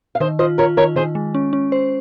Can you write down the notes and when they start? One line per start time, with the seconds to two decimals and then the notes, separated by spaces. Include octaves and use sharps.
0.15 F5
0.20 D#3 C5 D#5
0.39 F4 C5 D#5
0.58 F4 A#4 C#5
0.77 D#3 A#4 C#5
0.96 D#3 G#4 C5
1.15 G#3
1.34 C#4
1.53 C#4
1.72 C5